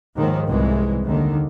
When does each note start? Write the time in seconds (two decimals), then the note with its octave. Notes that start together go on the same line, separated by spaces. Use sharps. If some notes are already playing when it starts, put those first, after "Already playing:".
0.15 D#2 G#2 D#3 F3
0.48 C2 E3 G#3
1.05 D#2 D3 D#3